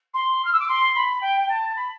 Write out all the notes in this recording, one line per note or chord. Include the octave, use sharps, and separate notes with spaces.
C6
F6
E6
D6
C6
B5
G5
G5
A5
B5